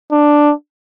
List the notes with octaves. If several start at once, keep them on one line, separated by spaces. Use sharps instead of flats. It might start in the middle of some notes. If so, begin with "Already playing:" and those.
D4